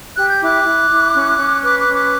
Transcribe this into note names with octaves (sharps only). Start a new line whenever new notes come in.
G4 F#6
G6
E4 D6 F#6
E4
E4
C#4
C#4
B4 D6 F#6
D6 F#6
C#4
D6 F#6